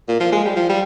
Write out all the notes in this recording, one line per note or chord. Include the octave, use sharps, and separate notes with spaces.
A#2
F3
G#3
G3
F3
G3